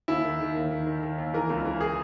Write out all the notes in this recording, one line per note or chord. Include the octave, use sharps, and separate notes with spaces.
D#2 E4
D#3
D#3
D#2
D#3
D#3
D#3
D#2
E3 A#4
C#2 A#4
E3 A#4
G#4